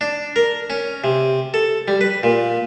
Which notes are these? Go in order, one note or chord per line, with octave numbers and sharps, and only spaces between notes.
D4
A#4
C#4
C3
A4
G3
B4
A#2